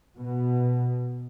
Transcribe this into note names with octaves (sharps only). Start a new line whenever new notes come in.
B2